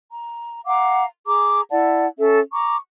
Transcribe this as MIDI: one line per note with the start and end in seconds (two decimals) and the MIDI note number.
0.12 0.61 82
0.66 1.03 77
0.66 1.03 78
0.66 1.03 82
0.66 1.03 86
1.26 1.62 68
1.26 1.62 82
1.26 1.62 86
1.70 2.06 64
1.70 2.06 74
1.70 2.06 78
1.70 2.06 81
2.19 2.40 61
2.19 2.40 69
2.19 2.40 76
2.52 2.77 82
2.52 2.77 85
2.52 2.77 86